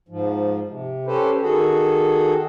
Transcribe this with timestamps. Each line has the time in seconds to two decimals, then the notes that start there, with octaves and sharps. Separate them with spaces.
0.09 G#2 F3
0.68 C3
1.06 C#4 G4 A4 B4 C5
1.42 D#3 F#4 G#4 A4